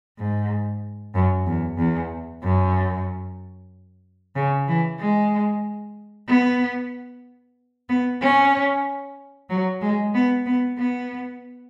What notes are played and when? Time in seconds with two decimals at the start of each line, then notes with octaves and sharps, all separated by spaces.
0.18 G#2
1.15 F#2
1.46 E2
1.78 E2
2.43 F#2
4.36 C#3
4.68 E3
5.00 G#3
6.29 B3
7.89 B3
8.22 C#4
9.50 F#3
9.82 G#3
10.14 B3
10.46 B3
10.78 B3